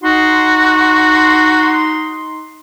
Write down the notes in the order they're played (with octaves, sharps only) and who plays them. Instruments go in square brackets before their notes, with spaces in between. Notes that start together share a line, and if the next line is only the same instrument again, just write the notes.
[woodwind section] D#4 C6 [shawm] F#4